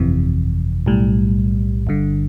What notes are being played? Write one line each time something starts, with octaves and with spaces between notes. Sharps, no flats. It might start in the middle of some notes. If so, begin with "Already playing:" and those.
Already playing: G1 F2 C3 E3
B1 A2 G3
G1 G2 D3